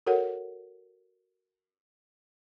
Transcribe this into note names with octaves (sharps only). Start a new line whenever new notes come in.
F#4 A4 A#4 C#5 F#5